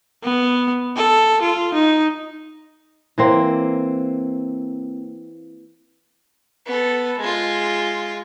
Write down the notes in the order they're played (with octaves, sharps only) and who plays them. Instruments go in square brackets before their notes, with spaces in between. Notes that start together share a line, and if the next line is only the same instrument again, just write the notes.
[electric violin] B3
A4
F4
D#4
[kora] E3 A#3 C4
[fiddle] B3 A4
G#3 F4